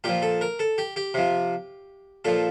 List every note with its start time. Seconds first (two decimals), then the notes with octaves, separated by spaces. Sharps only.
0.04 A#2 F3 G4
0.22 A4
0.41 A#4
0.59 A4
0.78 G4
0.96 G4
1.14 C3 F3
2.25 A#2 F3 A4